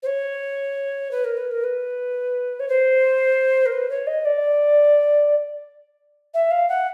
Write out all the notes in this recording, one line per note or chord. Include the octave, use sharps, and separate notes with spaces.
C5
C#5
B4
A#4
B4
A#4
B4
C#5
C5
A#4
B4
C#5
D#5
D5
E5
F5
F#5